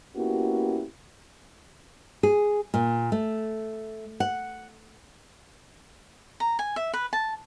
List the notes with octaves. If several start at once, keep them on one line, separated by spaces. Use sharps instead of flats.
A#3 B3 C#4 E4 F#4 G4
G#4
A#2
A3
F#5
A#5
G#5
E5
B4
A5